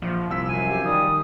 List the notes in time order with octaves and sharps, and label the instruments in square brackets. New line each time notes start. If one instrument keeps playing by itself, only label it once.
[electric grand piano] A#1 [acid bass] F3
[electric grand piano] C2 E6 B6
[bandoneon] F#2 G#5 [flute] F5
[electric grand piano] G4
[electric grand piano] D#3 [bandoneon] G3 [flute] D#6